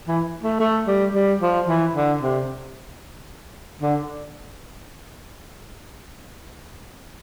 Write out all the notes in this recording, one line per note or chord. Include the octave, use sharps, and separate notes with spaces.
E3
A3
A3
G3
G3
F3
E3
D3
C3
D3